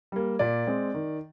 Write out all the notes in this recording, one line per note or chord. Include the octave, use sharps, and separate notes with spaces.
G3 A#3
A#2 D5
G#3 C4
D#3